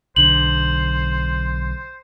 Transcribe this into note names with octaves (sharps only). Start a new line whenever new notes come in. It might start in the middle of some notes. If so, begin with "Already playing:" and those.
B1 D3 C5 F#7